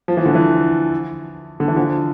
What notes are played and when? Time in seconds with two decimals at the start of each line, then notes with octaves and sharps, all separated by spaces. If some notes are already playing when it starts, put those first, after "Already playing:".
0.08 F3
0.17 E3
0.26 D3
0.35 E3
1.60 D3
1.68 E3
1.76 D3 F3